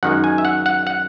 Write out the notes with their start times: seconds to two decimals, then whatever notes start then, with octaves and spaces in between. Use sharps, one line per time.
0.03 F#2 D#3 G#3 D#4 F#5
0.24 G#5
0.38 E5
0.45 F#5
0.66 F#5
0.87 F#5